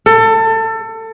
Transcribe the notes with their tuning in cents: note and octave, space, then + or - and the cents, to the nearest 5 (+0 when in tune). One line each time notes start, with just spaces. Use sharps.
A4 +25